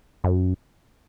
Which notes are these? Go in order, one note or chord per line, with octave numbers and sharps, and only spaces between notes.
F#2